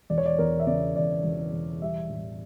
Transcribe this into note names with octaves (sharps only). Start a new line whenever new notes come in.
E1 D5
C#5
D5
E2 A#4
E5
C#3 D5
E1 D5
E1
E1
G3 E5
A1